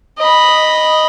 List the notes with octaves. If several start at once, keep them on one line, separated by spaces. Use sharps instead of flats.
D#5 B5